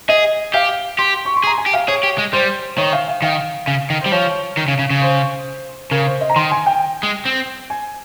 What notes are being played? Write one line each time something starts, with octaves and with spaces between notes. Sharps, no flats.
G#4 D#5
G4 F5
G4 C6
C#6
C6
G#4
A#5
G#5
G4
F5
G#4 C#5
G4
G#3
G3 C5
D#3 C#5
F5
F5
D#3 F5
C#3
D#3
G3 C5
F3 C#5
D#3
C#3
C#3
C#3
C5
C#3 A#4
C5
D#5
A#5
D#3 C6
G#5
G5
G#3
C4
G#5